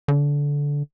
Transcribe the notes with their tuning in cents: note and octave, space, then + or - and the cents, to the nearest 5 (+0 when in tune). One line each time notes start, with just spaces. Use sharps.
D3 -20